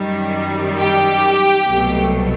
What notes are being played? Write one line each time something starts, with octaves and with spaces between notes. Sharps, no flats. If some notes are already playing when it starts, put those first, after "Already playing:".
Already playing: F#2 D#3 G3
G4
C2 B2 F#3 A3